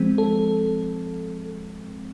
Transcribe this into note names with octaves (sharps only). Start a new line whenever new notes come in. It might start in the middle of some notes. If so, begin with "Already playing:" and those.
Already playing: F3 G#3 C4
A4